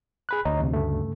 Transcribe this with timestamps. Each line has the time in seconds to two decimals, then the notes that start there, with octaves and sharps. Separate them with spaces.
0.29 G#4 B5 F#6
0.45 D2 C#5 D#5 A#5
0.60 E2 C3
0.72 G2 C#3 A3